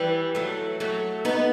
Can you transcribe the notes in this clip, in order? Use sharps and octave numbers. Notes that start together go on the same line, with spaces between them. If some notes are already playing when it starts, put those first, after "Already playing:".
Already playing: E3 G3
F#3 A3
F#3 A3
B3 D#4